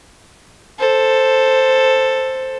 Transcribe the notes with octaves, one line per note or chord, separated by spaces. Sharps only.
A4 C5